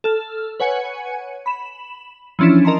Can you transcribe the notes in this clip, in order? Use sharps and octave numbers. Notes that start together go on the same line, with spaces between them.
A4 F6
B4 C#5 F#5 G#5 C#7
B5 E7
E3 F3 C#4 D4 E4
A#4 D#5 A5 A#5 C6